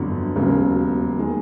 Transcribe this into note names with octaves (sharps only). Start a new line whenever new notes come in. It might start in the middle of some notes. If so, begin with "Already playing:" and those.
Already playing: G1 F2 D3 F#3 A3
E1 D#2 C#3 F#3
D#3 G#3